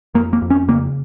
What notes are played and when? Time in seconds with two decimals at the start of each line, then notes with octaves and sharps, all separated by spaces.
0.15 F2 A#3
0.33 A#3
0.42 F2
0.50 C#4
0.68 C#3 A#3